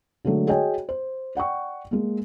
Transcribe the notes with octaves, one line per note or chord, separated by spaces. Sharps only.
D3 F#3 G#3 A3
F#4 G#4 C#5 D#5 G5 G#5
C5
D5 F#5 G5 C#6
G#3 A#3